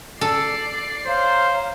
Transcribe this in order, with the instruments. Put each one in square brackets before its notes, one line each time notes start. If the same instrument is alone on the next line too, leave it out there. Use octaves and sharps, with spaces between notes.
[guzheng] A4 [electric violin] D5 C7
[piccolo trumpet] C5 [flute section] C#5 F5 A#5